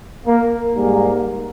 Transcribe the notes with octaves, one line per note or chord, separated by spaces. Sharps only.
A#3
G#2 G3 A#3